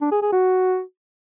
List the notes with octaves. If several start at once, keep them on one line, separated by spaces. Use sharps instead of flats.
D4
G#4
G#4
F#4